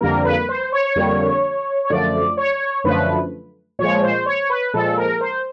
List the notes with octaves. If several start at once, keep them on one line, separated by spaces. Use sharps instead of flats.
F2 D3 G3 A#3 A#4
B4
C5
C#5
F2 D3 G3 A#3
C#5
F#2 D3 F3 A3 D5
C#5
F#2 D3 F3 A3 B4
A#2 F3 G#3 C#5
C5
C#5
B4
A#2 F3 G#3 A4
A#4
C5